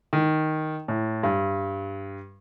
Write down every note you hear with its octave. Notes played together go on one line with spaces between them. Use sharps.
D#3
A2
G2